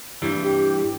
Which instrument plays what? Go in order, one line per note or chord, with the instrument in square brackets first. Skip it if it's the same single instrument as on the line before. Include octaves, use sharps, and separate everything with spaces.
[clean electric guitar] G2 E3 G3
[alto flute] G4